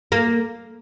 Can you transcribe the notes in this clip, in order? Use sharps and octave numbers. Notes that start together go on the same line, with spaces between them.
A#3